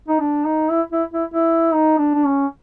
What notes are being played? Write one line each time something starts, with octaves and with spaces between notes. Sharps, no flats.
D#4
D4
D#4
E4
E4
E4
E4
D#4
D4
D4
C#4